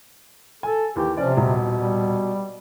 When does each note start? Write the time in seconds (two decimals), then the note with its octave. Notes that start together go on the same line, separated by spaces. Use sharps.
0.63 A4 G#5
0.96 D#2 E3 G4
1.17 C3 F3 C#4 D5
1.37 D#1 B2
1.78 G3